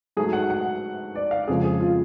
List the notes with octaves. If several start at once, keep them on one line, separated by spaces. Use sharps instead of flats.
G#2 F#3 A3 G#4
F#5
F#5
D5
F5
F2 C#3 F3 G#3 G#4
G#4
F4